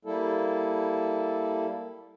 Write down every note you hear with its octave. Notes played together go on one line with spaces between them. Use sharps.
G3 A#3 E4 A4